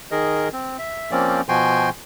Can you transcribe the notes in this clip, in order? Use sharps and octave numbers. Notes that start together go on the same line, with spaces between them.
D#3 G#4 A#4 D#5
C4
E5
F3 A#3 C4 C#4 D5
B2 F3 F#4 G5 G#5 C6